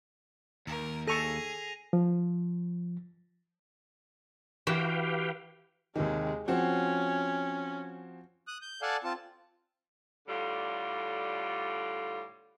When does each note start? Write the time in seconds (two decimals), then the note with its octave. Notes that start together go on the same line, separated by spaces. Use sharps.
0.67 D#2 A#4
1.07 G#4 A4 C#6 A#6 D#7 F7
1.93 F3
4.67 E3 F#4 G4 B4 F5 G5
5.96 D#2 C3 D#3 G#3
6.48 F3 C4 C#4 F#4
8.47 D#6 F#6
8.62 G6
8.82 A4 D5 F5 F#5 G#5 A5
9.04 C4 F4 A5
10.28 A2 D3 G3 F4